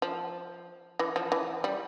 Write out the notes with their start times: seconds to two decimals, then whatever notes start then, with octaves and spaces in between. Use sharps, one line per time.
0.02 F3
0.99 E3
1.16 F3
1.32 E3
1.64 G3